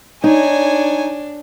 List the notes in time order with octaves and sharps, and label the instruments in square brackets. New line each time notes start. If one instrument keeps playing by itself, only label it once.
[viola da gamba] D4 [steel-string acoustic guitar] D#4 [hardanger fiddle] C#5 G#5